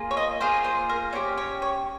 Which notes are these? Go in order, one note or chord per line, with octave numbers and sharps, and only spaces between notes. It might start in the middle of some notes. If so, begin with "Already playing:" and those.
Already playing: A#3 F4 G#4
C#5
D#5
A#3 F4 G#4 C5
C5
A#4
C#4 G4 C5
C#5
C#5